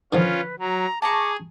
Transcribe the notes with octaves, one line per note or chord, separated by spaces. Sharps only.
D3 D#3 F3 C#4 F4 B4
F#3 A#5
G#4 A5 A#5 C#6 D6